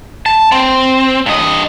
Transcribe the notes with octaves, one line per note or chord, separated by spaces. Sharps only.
A5
C4
G2 D#5